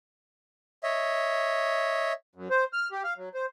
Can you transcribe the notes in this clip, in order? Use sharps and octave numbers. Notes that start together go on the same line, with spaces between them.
C#5 D#5 E5
F#2
C5
F6
G4
F5
F#3
C5